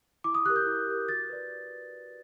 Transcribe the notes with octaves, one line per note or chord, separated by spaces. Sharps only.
E4 D6
D#6
G4 A#4 F#6
G6
E4
G4 A#4
F#4 A6
B4 D5